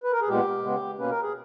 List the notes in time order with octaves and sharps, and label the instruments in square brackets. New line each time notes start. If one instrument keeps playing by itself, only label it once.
[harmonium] B4
A#4
G#4
A#2 G#3 B3 G4
C#3 G#3 B3
B2 A#3 C#4 B4
A#4
G#4